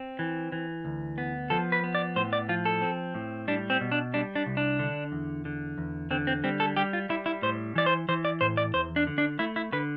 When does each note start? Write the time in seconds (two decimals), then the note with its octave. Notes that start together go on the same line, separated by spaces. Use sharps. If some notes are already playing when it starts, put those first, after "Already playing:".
Already playing: C4
0.19 E3
0.52 E3
0.85 D2
1.18 B3
1.50 F3 A4
1.72 B4
1.84 B3
1.95 D5
2.16 A2 C5
2.33 D5
2.49 F3 F4
2.65 A4
2.82 C4
3.15 A2
3.48 G3 D4
3.70 C4
3.81 B2
3.92 D4
4.14 G3 D4
4.36 D4
4.46 C2
4.57 D4
4.79 D3
5.12 E2
5.45 D3
5.78 E2
6.11 D3 C4
6.27 C4
6.44 G3 C4
6.60 A4
6.77 G3 G4
6.93 F4
7.09 G3 E4
7.26 E4
7.42 A2 C5
7.75 E3 D5
7.86 C5
8.08 E3 C5
8.25 D5
8.41 A2 C5
8.57 D5
8.74 E2 C5
8.96 D4
9.07 D3
9.18 D4
9.39 A3 E4
9.56 E4
9.73 D3 B4